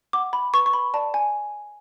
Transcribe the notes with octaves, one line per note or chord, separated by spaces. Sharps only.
F#5 D6
B5
B4 C#6
C#6
B5
D5 A5
G#5